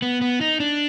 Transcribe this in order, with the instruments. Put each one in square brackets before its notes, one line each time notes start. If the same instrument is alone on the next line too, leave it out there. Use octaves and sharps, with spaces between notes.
[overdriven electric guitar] B3
B3
D#4
D4